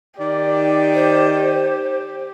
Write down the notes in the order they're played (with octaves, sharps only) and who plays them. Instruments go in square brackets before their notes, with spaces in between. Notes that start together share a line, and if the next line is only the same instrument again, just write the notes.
[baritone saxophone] D#3 [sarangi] G4 [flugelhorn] D5
[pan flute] C5